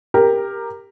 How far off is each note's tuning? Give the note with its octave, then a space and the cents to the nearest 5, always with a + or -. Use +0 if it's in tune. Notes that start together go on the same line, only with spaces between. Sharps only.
G4 +15 A#4 +0